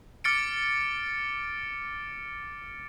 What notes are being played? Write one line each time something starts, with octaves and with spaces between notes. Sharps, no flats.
D6 F6 A6 C#7 D7